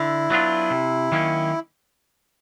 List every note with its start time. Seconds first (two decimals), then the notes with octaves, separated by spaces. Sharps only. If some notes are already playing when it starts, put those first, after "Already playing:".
Already playing: D3 E4
0.30 F#3 B3 D4 F4
0.70 C3
1.12 D#3 F#3 A#3 C#4